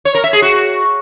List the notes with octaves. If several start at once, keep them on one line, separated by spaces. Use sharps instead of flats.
C#5
A#4
E5
G#4
F#4